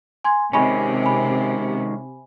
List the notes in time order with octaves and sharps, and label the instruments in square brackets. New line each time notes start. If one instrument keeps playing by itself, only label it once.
[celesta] G#5 C6 G#6
[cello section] C3 [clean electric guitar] D#3 G#3 C#4 [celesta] G#5 B5 C#6
[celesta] G#5 B5